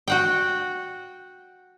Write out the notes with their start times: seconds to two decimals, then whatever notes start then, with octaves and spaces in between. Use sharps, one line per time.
0.08 F#4 F#5 G5